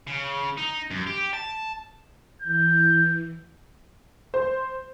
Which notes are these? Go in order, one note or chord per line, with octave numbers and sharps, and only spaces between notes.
C#3
D#4
F#2
G4
A5
E3 G6
C5